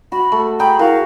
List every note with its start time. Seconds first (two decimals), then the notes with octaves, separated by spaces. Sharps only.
0.12 F#4 B5
0.32 A3
0.60 G#4 G5 A#5 B5
0.79 E4 F#4 A#4 F5